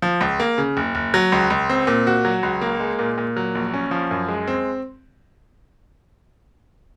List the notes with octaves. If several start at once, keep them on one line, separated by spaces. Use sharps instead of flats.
F3
C#2
A#3
C#3
F#1
F#1
F#3
C#2
C#2
C4
A#2
F#4
F#3
C#2
A#3
G#3
A#2
A#2
F#3
A#1
C#4
F3
F#2
G#3
C4